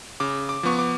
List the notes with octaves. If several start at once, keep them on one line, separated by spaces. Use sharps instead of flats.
C#3 D6
D6
F3 B3 C#6
D6